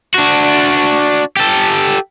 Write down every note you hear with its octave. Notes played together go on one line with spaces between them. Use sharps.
D4 F#4
G4 A4